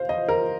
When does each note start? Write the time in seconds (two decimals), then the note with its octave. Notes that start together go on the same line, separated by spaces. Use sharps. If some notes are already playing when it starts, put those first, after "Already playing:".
Already playing: C5 F5
0.09 D#5
0.29 A#4